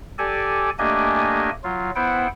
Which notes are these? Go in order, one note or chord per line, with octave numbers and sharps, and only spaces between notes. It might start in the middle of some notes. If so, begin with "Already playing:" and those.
G4 A4 D5 G#5
A3 A#3 D4 G4 D#5 G#5
F#3 F4
B3 E4 C5 F#5 G5